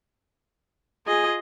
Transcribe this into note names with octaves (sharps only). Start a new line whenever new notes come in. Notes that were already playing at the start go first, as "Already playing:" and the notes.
F4 G#4 D#5